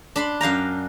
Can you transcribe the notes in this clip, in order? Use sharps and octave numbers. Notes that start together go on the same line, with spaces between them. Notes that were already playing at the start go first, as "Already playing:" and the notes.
D4 B5 C6
F#2 F5 G5 A#5